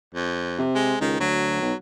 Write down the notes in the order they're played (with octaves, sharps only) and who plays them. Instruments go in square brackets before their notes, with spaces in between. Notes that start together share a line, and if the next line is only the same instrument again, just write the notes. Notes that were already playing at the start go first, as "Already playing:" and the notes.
[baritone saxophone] F2
[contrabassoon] C3
[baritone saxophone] G#3
[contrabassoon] C#2 [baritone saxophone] D#3
[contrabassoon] D2 [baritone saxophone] F#3
[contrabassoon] B1